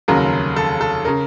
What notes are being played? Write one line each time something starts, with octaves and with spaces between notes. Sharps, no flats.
F1 D#2 C#3 F#3 A#4
A4
A4
C#3 A#4